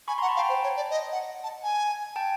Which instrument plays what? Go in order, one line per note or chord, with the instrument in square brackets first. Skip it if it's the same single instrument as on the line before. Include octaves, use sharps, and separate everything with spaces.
[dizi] G#5 [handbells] B5 C#6
[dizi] F#5 [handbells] A#5 C6
[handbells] A5 B5
[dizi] F5
[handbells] G5 A5
[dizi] C5
C#5
D5
D#5
F#5
A5
G#5
[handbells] G5 A5